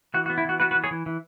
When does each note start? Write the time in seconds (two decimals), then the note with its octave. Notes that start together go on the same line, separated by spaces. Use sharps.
0.14 E3 F#4
0.26 F#4
0.30 B3
0.38 E4
0.45 E3 F#4
0.60 B3 F#4 B4
0.71 F#4 B4
0.75 E3
0.84 G#4 C#5
0.91 E3
1.06 E3